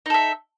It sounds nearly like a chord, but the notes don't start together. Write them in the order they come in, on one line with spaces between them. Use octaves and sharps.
D#4 A4 E5